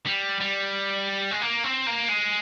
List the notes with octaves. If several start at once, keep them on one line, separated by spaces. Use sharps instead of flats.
G3
G3
G#3
A#3
C4
A#3
G#3